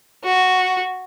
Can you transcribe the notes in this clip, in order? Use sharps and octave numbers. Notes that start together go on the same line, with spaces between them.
F#4